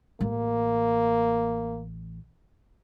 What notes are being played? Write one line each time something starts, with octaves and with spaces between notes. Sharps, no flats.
A1 A#3